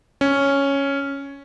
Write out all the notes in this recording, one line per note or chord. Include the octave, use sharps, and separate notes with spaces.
C#4